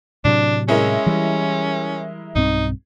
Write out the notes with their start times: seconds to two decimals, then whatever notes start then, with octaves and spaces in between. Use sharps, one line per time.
0.25 A2 C3 F#3 D4
0.68 G#3 C#4 E4 A#4
1.06 E3 G3
2.35 B1 G2 C4 D#4